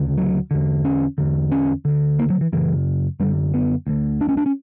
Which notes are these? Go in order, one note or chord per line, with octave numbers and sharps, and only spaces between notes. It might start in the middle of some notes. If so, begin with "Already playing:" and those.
Already playing: D2 C#3
F#3
E2 D3
C#4
E2 D3
C#4
D2 D3
A#3
F#3
E3
F#2 C#3 E3
F#2 D3 G3
B3
D2 D3
D4
C#4
D4
C#4